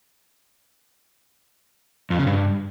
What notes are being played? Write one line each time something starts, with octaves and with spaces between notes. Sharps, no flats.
F2
C#3
G2